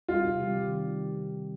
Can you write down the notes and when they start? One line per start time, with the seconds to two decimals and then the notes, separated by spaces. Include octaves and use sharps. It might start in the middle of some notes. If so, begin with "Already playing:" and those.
0.08 G3 C4 F4 G4
0.25 C3
0.40 G3 C4 G4
0.56 D#3